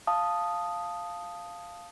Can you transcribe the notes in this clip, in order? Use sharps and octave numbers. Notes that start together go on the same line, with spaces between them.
F5 A5 D#6